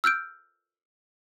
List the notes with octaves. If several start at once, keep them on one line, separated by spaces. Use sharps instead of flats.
E6 F6 G6 D7